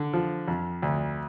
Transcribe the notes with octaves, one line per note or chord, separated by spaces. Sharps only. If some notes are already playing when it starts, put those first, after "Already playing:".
Already playing: D3
F3
F2
D2